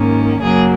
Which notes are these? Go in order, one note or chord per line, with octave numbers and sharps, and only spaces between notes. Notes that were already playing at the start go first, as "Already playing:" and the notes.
Already playing: G#2 D#3 A#3 C#4
F#2 C#3 F#3 A#3 G#4